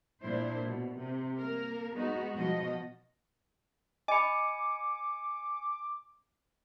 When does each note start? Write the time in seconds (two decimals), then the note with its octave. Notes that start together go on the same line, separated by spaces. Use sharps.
0.23 A#2 D4 E4 C5
0.65 B2
0.98 C3
1.39 A#3 A#4
1.94 G#3 B3 D#4 F#4
2.35 B2 F3 F#4 D#5
4.08 D#5 G#5 B5 D6 C#7